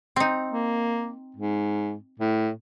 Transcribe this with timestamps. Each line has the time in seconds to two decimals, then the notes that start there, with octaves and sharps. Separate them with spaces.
0.16 C4 D#4
0.52 A#3
1.36 G#2
2.20 A2